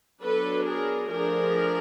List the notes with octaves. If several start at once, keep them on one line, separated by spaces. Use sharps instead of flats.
F#3 B3 D4 A4 B4
G#4 A#4
F3 A3 D4 G#4 A#4